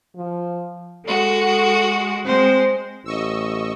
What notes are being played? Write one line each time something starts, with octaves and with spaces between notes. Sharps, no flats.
F3
G#3 F#4 A4
G#3 C4 C5
A1 D#5 C#6 E6